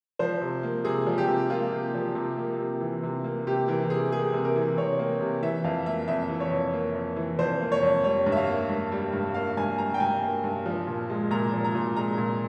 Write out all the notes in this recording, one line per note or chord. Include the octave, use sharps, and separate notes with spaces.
F3 C5
C3
A#3
C3 G#4
F3
G4
C3
A#3 F4
C3
F3
C3
A#3
C3
E3
C3
A#3
C3 G4
E3 A#4
C3 G#4
A#3 G#4
C3
A#4
E3
C3 C#5
A#3
C3
E3 E5
F2 F5
A#3 E5
F2 E5
E3
C#5
F2
A#3
F2
E3
F2 C5
A#3
C#5
F2
G3 C#5
G2
E5
F5
A#3
G2
G3
G2
A#3 F5
G2 G#5
G3 A#5
G5
G2 G#5
A#3
G2
F3
A#2
G#3
A#2 A#5
F3
A#5
A#2
G#3 A#5
A#2